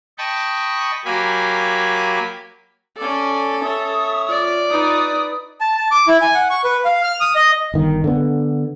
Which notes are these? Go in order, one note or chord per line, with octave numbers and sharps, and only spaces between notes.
D#5 G5 A5 B5 C#6
F#3 A#3 G4 G#5 B5
C#4 A4 D5
C#5 E5 D#6
F4 D5
D#4 B4 D#6
A5
A5
D6
E4
G#5
F#5
C#6
B4
F5
F6
D#6
D#5
G1 D#3
D3 B3